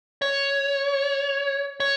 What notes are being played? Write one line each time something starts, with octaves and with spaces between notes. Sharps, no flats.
C#5
C#5